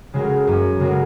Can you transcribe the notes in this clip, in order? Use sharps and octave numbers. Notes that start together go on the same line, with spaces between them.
C#3 G#3 F#4 A#4
F#2
C#3 G#3 F#4 A#4